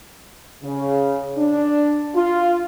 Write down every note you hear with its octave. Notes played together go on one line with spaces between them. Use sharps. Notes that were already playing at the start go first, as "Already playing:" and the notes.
C#3
D4
F4